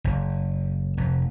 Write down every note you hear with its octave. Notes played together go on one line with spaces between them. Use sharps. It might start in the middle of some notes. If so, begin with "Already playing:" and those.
F#1
F1